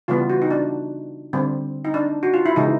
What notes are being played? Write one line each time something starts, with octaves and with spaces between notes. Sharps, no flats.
C#3 E3 G3 B3 F4
F#4
D#4
D4
D3 G3 C4
D#4
D4
F#4
F4
E4
C#3 E3 G#3 D#4